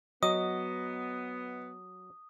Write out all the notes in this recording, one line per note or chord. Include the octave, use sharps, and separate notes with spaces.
F#3 B3 D#5 D#6